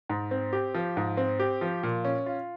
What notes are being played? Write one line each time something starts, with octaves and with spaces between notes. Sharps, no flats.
G#2
C4
G4
F3
G#2
C4
G4
F3
A#2
C#4
F4